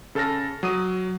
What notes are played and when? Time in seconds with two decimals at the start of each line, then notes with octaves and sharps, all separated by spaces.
0.15 C#3 A4 A5 F6 A#6
0.63 F#3 D#6 D#7